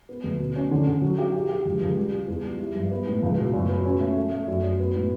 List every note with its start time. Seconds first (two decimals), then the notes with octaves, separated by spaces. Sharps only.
0.09 B3
0.24 D2
0.40 B2
0.56 C#4
0.71 D3
0.87 D3
1.02 F#3
1.18 G4
1.34 G4
1.49 G4
1.65 C#2
1.81 C#2
1.97 G3
2.12 G3
2.28 E2
2.44 G3
2.60 E4
2.75 G2
2.91 B3
3.07 A2
3.22 C#2
3.38 B2
3.54 F#2
3.69 B3
3.85 C#4
4.01 A3
4.17 A3
4.32 A3
4.48 F#2
4.64 F#2
4.80 B3
4.95 A2